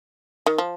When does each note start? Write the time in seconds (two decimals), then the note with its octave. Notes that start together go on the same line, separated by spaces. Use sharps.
0.46 D#3
0.58 F3